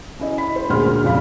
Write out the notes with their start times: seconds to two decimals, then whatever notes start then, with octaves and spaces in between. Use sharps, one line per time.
0.20 C#4 E4 D#5
0.38 B5
0.56 C5
0.69 D2 A#2 G#3 C6 F6
1.03 F2 C#3 F3 F5 B5